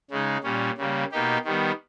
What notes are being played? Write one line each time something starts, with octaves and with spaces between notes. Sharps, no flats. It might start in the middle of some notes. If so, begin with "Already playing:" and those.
C#3 G#3 D#4
A#2 G3 C#4
C#3 G3 A#3
B2 A#3 D#4 G4
D#3 G3 B3